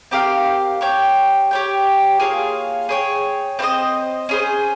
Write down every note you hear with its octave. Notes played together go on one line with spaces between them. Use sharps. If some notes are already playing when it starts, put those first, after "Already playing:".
C4 G4 A#4 F5
G4 C#5 G5
G4 C#5 G5
A#3 F4 G#4 C#5
G#4 C#5 G5
C4 F4 C5 D#5
C#4 G#4 C5